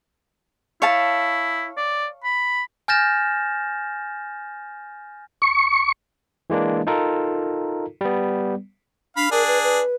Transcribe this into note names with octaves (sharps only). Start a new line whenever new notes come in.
E4 C#5 F5 A5
D5
B5
G#5 F6 G6 A6 A#6 E7
C#6
E3 G#3 A#3 D4
D#4 F4 A4 A#4
G3 B3
D4 F5 B5
D4 G#4 A#4
B4
B4